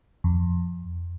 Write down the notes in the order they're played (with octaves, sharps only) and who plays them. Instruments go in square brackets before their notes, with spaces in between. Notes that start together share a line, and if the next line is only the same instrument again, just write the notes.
[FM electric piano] F2